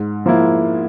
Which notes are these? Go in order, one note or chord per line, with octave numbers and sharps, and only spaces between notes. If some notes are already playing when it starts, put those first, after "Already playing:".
Already playing: G#2
F3 A#3 E4